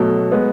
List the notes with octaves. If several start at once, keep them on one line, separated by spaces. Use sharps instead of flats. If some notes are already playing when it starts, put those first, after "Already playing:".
Already playing: B2 F#3 A3 A4
G#3 B3